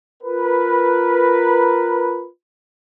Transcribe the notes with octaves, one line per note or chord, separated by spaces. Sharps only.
F4 A#4 B4